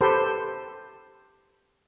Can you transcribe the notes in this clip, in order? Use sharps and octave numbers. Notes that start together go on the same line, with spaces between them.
G4 A4 B4 C5